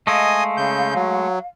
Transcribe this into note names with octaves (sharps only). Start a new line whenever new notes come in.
G#3 A3 D#5 F5 G#5 D#6
C#3 G6
F#3